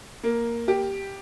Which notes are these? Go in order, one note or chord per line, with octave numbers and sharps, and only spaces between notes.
A#3
G4